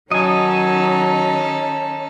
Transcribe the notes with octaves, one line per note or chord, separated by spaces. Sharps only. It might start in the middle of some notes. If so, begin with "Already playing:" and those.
D#3 F#3 C#4 D#4 A4 D#5 G#5